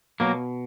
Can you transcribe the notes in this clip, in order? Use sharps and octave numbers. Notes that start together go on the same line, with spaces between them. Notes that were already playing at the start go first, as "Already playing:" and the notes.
B2 F#3 A#3